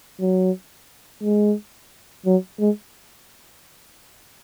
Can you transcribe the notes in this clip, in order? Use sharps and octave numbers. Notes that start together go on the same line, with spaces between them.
F#3
G#3
F#3
G#3